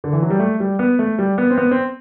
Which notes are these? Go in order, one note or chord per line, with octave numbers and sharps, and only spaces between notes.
D3
E3
F#3
G3
A3
G3
B3
A3
G3
B3
C4
B3
C4